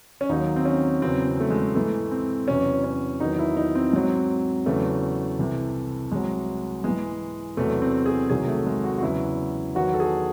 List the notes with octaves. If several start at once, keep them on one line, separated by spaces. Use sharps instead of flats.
C#4
D#2 D#3 F#3 D#4
C4
C#4
E2 C#3 F#3 C4
C4
A3
G#3
G#2 E3 A3
C4
E2 C3 F#3 C#4
C#4
E2 D#3 F#3 D#4
E4
D#4
C4
G#2 F#3
E2 C#3 F#3 A3
C2 C3 E3
C2 C3 F#3 G#3
G#2 E3 G#3
E2 C3 F#3 A3
C4
G#4
C2 C3 D#3 F#3 G#4
A3
G#3
F#4
F#4
E2 C#3 F#3 E4
E2 D#3 F#3 F#4
A4
G#4